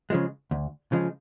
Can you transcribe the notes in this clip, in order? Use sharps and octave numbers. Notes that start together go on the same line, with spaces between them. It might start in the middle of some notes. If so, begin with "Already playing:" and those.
C#3 F3 G#3
D2
C#3 F3 G#3